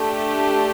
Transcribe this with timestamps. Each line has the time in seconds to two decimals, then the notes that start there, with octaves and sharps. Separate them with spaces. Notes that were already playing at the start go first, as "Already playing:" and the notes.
Already playing: A3 D4 G4